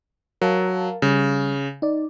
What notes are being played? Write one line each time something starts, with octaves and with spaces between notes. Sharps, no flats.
F#3 A#4 F5 A5
C#3 G3
D#4 D5